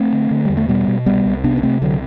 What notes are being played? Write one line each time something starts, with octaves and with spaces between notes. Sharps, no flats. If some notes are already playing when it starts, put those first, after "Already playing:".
Already playing: A3 C4
D3
D3
E2 G3
A3
B2 G3 B3
B2
C2 G3 B3
C2
C3 B3 D4
D4
C3 A3 C4
C2 D3 F#3